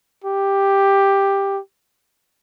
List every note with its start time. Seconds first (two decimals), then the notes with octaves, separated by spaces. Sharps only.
0.24 G4